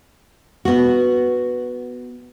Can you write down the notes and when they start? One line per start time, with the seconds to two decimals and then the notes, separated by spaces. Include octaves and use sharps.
0.65 B3 F#4